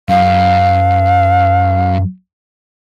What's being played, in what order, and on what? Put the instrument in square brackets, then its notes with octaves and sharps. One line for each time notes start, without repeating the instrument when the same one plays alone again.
[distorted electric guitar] F#2 [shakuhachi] F5